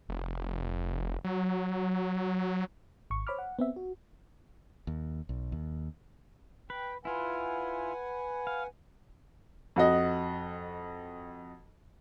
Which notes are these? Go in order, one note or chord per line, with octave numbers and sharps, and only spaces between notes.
F1
F#3
G#1 C#6
C5 C#5 B5 D6 F6
F#5
B3 C4 E5
F#4
D#2
B1
D#2
B4 G5
E4 F4 B4 F#5 G#5
F5
F2 F#4 D#5